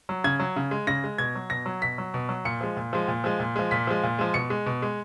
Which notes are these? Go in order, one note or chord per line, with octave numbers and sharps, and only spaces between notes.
F#3
C#3 G#6
F#3
C#3
G#3
C#3 A#6
G#3
B2 G#6
F#3
B2 A#6
F#3
B2 B6
F#3
B2
F#3
A#2 C#7
F3 G#3
A#2
F3 G#3
A#2
F3 G#3
A#2
F3 G#3
A#2 B6
F3 G#3
A#2
F3 G#3
B2 C#7
G#3
B2
G#3